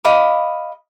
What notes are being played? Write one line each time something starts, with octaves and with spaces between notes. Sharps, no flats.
D#5 F5 B5 D6